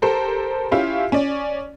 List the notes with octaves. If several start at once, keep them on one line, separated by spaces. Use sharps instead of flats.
G4 A4 A#4 C5
C#4 E4 F4 G4 E5
C#4 D5